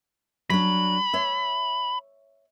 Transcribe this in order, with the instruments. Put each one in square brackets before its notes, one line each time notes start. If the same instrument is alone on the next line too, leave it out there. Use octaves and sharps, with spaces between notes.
[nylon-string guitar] F#3 D4 [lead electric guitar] B5
[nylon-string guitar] C#5 E5